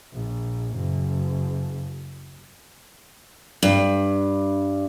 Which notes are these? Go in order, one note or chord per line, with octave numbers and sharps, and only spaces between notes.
A#1
F#1
G2